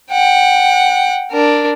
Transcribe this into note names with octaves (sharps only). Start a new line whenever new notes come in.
F#5 G5
D4 A#4